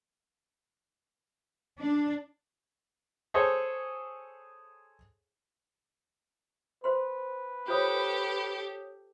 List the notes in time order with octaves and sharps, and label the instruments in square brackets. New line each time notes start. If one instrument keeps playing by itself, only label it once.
[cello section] D4
[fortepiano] G#4 A4 C5 C#5
[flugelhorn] B4 [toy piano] C5 C6
[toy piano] F4 C5 D6 [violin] G4 A4 [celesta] C#5 D#6 G6